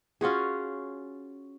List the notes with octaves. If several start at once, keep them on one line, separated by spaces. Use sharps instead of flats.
C#4 F4 F#4 G#4